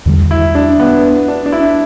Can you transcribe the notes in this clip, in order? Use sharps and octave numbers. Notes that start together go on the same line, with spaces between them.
E2 D3 G3
E4
D4
B3
D4
D4
E4